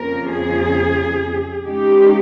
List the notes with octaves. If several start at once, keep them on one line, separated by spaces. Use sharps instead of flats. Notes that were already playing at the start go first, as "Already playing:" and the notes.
Already playing: F2 C#3 F3 A#3 A#4
G#4
C#3 G#3 D#4 G4